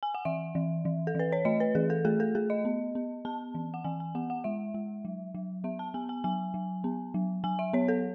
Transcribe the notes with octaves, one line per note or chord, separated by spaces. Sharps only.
G#5
F#5
E3 E5
E3
E3
A4
E3 B4
C#5
A3 D#5
B4
E3 G#4
A4
A3 G#4
A4
A3 G#4
D#5
B3
B3
B3 A5
E3
F#5
E3 G#5
G#5
B3 F#5
F#5
G#3 E5
G#3
F#3
F#3
B3 E5
A5
B3 G#5
G#5
F#3 G#5
F#3
B3
F#3
F#3 G#5
E5
B3 C#5
A4